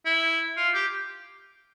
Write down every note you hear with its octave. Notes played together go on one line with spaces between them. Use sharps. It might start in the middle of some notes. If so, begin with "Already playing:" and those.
E4
F4
G4